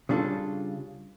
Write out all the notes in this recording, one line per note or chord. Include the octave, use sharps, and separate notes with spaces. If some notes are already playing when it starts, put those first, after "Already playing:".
C#3 G3 D4 F4 A4